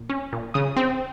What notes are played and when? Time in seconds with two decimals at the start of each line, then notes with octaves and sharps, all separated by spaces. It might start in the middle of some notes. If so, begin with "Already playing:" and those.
Already playing: A#2
0.09 C#4
0.33 A#2
0.54 C#3 D#6
0.76 C4